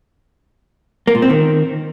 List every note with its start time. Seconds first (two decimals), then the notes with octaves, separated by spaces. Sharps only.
1.07 A#3
1.15 A#2
1.22 C4
1.30 D#3